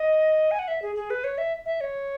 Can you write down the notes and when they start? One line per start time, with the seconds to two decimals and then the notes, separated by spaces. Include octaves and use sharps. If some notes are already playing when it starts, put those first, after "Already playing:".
Already playing: D#5
0.51 G#5
0.59 F#5
0.68 E5
0.82 G#4
0.96 G#4
1.10 B4
1.24 C#5
1.38 E5
1.65 E5
1.81 C#5